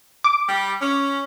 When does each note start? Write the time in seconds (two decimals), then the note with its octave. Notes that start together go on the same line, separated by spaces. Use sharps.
0.24 D6
0.48 G3
0.81 C#4